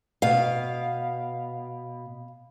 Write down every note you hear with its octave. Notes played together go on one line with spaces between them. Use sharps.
B2 B3 F5